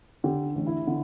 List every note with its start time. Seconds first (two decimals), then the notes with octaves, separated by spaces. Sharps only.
0.24 D3 G4
0.55 A1
0.67 E4
0.87 D3 E4